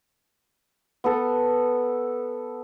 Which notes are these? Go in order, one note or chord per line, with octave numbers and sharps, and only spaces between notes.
B3 A4